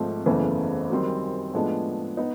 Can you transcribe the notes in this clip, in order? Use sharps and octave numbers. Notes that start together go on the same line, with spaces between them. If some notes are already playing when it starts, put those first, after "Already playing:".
Already playing: G#1 G#2 F3 A3 C4
F#1 E2 C#3 E3 A3
F#2 D#3 G3 C4
A2 F3 G#3 B3 D4
B3 D#4